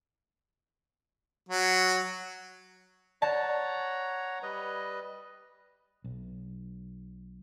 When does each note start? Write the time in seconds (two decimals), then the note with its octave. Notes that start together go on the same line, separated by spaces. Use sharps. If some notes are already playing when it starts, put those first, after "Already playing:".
1.49 F#3
3.22 C#5 D5 F#5 A5 A#5
4.43 G3 B4 D#5
6.04 B1